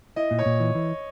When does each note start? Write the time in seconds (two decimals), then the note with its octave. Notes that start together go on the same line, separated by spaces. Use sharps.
0.16 E4 D#5
0.31 A#2
0.39 C#5
0.46 A#2
0.60 E3
0.75 E3